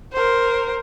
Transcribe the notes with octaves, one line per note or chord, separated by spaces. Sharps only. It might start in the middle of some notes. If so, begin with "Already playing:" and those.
A#4 C5